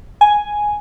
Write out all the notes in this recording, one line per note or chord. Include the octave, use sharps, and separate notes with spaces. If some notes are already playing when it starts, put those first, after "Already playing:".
G#5